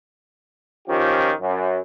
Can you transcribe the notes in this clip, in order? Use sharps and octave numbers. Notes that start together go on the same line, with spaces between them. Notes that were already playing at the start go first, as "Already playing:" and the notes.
D#3 F3 C#4 F4 G4
F#2